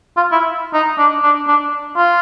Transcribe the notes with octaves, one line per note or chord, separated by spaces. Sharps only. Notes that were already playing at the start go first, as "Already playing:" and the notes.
F4
E4
D#4
D4
D4
D4
F4